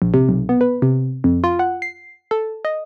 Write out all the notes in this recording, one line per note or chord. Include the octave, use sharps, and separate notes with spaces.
A#1
C3
B1
B3
B4
C3
F2
F4
F#5
C7
A4
D#5